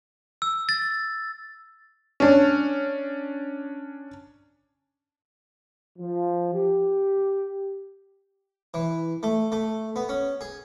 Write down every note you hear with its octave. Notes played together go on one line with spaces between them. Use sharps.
E6
A6
C#4 D4
F3
G4
E3
A3
A3
B3
C#4
G#4